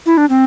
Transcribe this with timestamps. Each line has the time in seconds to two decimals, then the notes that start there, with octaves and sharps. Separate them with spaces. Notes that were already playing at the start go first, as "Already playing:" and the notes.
0.06 E4
0.17 D4
0.30 C4